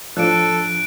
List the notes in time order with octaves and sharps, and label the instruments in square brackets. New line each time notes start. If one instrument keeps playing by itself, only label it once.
[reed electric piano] A2 F3 D4 [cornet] A4 [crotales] F#6 D7